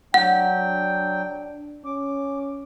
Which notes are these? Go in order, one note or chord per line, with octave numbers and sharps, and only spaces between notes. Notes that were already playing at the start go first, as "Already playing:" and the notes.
F#3 D4 F#5 G5
C#4 D6